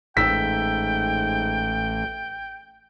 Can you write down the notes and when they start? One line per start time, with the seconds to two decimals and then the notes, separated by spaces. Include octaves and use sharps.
0.17 A1 G#2 G5 E6 B6